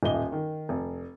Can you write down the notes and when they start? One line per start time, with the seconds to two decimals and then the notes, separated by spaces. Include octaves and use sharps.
0.03 D#1 A1 D#5 G7
0.32 D#3
0.69 F1